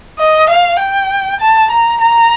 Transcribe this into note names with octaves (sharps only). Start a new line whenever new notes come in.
D#5
F5
G5
A5
A#5
A#5